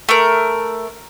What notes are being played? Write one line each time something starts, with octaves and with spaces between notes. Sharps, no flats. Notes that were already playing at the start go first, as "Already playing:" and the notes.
A3 A#4